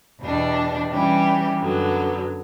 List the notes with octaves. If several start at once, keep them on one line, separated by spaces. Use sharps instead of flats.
E2 B2 G3 D4
E3 G3 C#4 G4
F#2 D3 F#3 B3